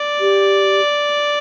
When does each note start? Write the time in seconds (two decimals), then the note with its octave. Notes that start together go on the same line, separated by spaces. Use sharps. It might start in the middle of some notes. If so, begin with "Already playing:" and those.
Already playing: D5
0.21 G4